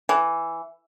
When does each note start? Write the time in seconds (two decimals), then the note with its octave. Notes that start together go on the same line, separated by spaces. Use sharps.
0.09 E3